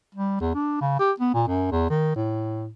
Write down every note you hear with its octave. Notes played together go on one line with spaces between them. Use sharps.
G3
E2
D4
C#3
G4
B3
A#2
F#2
E2
D#3
A2